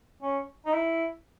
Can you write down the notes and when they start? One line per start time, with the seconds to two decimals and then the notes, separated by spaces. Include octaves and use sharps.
0.22 C#4
0.65 D#4
0.73 E4